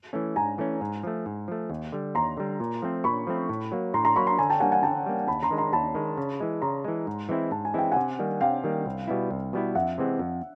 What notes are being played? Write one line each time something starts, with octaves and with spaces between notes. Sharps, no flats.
E3 A3 C#4
G#2 G#5 A#5
E3 A3 C#4
G#2
F3 A3
G#2
F3 A3
D#2
D3 G3
D#2 A#5 C6
D3 G3
A#2
F3 A3 C4
A#2 B5 C#6
F3 A3 C4
A2
F#3 A#3
A2 A#5 C6
A#5 C6
F#3 A#3 B5 C#6
A#5 C6
D3 G#5 A#5
G5 A5
G3 A#3 F#5 G#5
F#5 G#5
D3 G5 A5
G3 A#3
D#2 A5 B5
A#5 C6
D#3 G#3
A#5 C6
D#2 A5 B5
D#3 G#3
C#3
E3 G#3
C#3 A#5 C6
E3 G#3
G#2
E3 G#3 C4 E4
G#2 A5
G#5
E3 G#3 C4 E4 G5
C3 F#5 G#5
D#3 G3 A#3
C3 F5 G5
D#3 G3 A#3
C2
B2 G3 B3 E4
C2
B2 G3 B3 E4
F2 E5 F#5
C3 E3 G#3 C4
F2